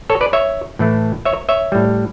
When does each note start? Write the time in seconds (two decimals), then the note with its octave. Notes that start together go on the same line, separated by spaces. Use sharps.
0.10 A4 C#5
0.21 B4 D5
0.33 C#5 E5
0.79 A2 E3 A3
1.25 C#5 E5
1.49 C#5 E5
1.72 A2 G3